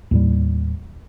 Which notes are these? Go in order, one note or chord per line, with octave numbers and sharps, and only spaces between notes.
D#2 A2 G3